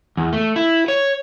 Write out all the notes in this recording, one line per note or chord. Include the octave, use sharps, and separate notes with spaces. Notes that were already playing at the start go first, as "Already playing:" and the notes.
E2
A3
E4
C#5